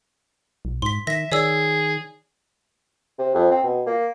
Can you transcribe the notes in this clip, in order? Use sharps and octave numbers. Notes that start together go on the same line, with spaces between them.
B1
G#2 C6 B6
D#3 E5 A#6 B6
D#3 G#4 C#5 D5 E6
C3
F2
C4
B2
A#3